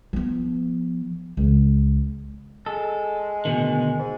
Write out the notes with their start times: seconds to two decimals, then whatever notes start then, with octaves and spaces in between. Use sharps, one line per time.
0.13 F3 B3
1.37 C#2
2.66 G#3 A4
3.45 D2 B2 D#3
3.99 G#2